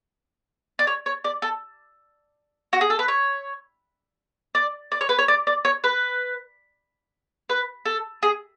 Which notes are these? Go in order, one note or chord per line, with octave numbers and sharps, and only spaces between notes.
D5
C#5
C#5
D5
A4
F#4
G#4
A4
B4
C#5
D5
D5
C#5
B4
C#5
D5
D5
C#5
B4
B4
A4
G#4